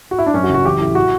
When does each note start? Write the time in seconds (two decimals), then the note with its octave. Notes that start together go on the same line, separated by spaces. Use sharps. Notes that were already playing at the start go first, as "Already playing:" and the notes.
0.11 F#4
0.19 E4
0.26 D4
0.34 F#2 C#4
0.44 F#4
0.49 F#1
0.54 F#4
0.65 A1 G4
0.81 A2
0.95 F#4